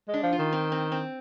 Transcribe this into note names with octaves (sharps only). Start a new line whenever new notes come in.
G#3
D4
F3
F4
D#3
C4
C4
C4